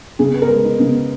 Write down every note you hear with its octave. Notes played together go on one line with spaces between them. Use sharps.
C#3 G#4
B3
A#4
G#3
D#4
C#3
B3